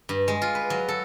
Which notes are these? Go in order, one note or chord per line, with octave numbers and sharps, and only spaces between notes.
G2
G#3
F4
B4
F#3
A4